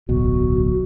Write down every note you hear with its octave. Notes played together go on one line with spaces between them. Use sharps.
D1 B1 B2 F#4